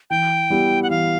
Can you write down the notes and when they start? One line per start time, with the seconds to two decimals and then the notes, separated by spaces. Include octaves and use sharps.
0.10 E3 G5
0.50 G3 B3 E4 G4
0.83 F#5
0.90 E3 F5